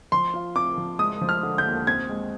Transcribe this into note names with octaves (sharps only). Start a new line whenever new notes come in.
F3 C6
F4
C4 D6
F3
G#3 D#6
F3
F6
D3
G6
D#2
C4 G#6
G#3